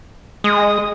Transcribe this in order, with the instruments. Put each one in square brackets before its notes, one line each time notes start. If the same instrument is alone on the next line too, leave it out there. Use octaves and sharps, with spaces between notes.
[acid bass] G#3 [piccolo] D#6